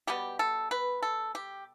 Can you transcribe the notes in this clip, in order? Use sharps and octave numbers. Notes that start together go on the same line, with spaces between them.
B2 G3 B3 G4
A4
B4
A4
G4